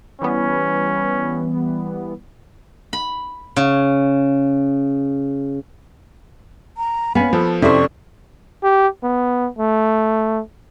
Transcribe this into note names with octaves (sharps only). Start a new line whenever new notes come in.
E3 G3 B3 C#4
B5
C#3
A#5
B3 C#4 F5 G#5 B5
F3 B3 A4
F2 C3 C#4 E4 A4 C5 D5 C#6
G4
B3
A3